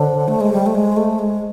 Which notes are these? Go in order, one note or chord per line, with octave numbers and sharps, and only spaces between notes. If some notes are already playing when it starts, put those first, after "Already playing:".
Already playing: D3 C5 C#5
A3
G#3
G3
A3
G#3
A3
G#3